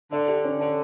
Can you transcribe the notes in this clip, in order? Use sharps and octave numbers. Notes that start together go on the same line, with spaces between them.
D3 D5
G4
C#4
D3 D5